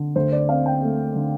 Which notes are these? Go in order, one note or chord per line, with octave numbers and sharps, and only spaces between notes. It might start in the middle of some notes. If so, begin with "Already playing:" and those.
Already playing: D3
D2 C5
D5
C4 F5
G5
A3
D3